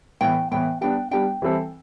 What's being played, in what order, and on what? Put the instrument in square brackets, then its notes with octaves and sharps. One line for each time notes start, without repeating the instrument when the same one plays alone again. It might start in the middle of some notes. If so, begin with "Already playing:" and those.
[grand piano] A2 E3 B3 [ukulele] G5
[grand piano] A2 E3 B3 [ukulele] G5
[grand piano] G3 B3 D4 [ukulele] G5
[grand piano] G3 B3 D4 [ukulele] G5
[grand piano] E3 G3 C4 E4 A4